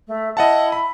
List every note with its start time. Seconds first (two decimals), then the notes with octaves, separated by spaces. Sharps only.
0.07 A3
0.37 E4 D#5 F#5 A5
0.72 B5